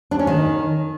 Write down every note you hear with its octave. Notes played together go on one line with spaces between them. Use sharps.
D4
C#4
D#3